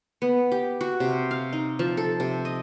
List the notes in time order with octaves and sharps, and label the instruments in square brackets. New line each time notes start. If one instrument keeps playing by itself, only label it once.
[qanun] B3
G4
F#4
C3
F5
D#4
F3
A4
C3
D#5